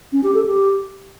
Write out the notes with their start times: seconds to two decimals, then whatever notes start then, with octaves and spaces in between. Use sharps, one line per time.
0.13 C#4
0.24 G4
0.35 A4
0.45 G4